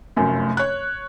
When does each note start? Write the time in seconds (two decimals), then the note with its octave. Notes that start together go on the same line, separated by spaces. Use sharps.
0.17 F1 F#2 A2
0.57 C#5 F#6